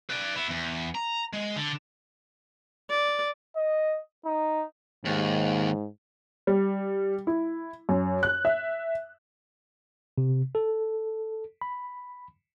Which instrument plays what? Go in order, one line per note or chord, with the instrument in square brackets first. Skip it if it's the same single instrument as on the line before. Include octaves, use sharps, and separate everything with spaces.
[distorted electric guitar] B4 D5
B3 E4
E2
A#5
G#3
D3
[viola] D5
[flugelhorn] D#5
D#4
[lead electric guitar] D#2 [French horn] G#2
[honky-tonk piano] G3
E4
F#2
F#6
E5
[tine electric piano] C3
A4
B5